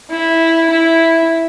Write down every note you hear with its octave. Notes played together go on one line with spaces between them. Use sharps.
E4
E4